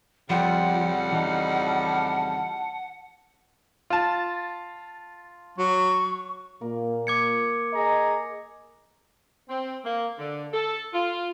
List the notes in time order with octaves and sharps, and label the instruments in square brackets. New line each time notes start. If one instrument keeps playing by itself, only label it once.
[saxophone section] F2 C#3 G3 [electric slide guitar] F3 [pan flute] F#5 [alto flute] G5
[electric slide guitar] E3 D#4 [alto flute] A5
[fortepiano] F4 A5
[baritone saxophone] F#3 [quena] C#6
[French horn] A#2 [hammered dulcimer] A#3
[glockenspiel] D6 G#6 C#7
[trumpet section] G#4 A#5 [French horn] D#5
[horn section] C4
A#3
D3
A4
F4